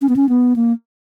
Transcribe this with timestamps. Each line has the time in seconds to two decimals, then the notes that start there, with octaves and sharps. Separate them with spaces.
0.02 C#4
0.09 B3
0.16 C#4
0.29 B3
0.56 A#3